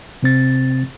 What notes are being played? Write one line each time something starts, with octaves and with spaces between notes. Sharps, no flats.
C3 C4 A6